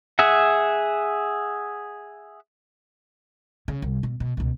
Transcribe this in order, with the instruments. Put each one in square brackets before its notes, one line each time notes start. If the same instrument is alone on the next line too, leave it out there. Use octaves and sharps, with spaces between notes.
[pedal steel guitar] G#4 E5 F#5
[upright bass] C#3
C2
B2
B2
C#2 B2